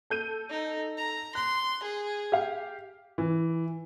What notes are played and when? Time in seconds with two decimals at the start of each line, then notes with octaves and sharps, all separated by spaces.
0.10 A4 G6 D#7
0.50 D#4
0.97 A#5
1.35 C6 F#6
1.83 G#4
2.32 G4 F5
3.18 E3